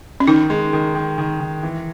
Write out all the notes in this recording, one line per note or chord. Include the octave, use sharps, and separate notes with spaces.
C#4
D#3 D#4
G#3
D#3
D#3
D#3
D#3
E3